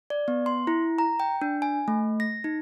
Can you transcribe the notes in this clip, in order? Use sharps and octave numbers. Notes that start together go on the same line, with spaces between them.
D5
B3
C6
E4
A#5
G5
D4
G#5
A3
A#6
D#4